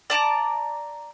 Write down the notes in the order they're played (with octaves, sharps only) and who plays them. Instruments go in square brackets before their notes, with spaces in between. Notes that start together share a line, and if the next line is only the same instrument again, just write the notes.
[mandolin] D5 A5 A#5 D6